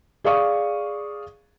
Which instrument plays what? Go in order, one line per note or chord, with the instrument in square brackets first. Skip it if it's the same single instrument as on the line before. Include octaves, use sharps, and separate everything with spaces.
[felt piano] G#4 D5 F5 C#6 D#6